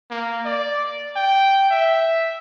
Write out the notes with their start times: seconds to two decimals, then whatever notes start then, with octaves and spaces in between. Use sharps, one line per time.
0.11 A#3
0.45 D5
1.16 G5
1.71 E5